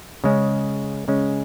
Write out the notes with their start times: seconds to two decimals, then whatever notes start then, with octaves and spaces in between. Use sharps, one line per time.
0.24 C#3 G#3 C#4
1.08 C#3 G#3 C#4